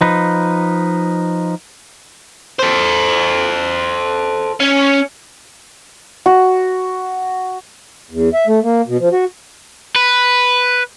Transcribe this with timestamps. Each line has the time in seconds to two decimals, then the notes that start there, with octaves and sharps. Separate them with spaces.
0.01 F3 D#4 B4
2.59 A4 C5
4.60 C#4
6.26 F#4
8.11 E2
8.34 E5
8.47 A3
8.63 A#3
8.88 B2
8.99 F3
9.12 F#4
9.96 B4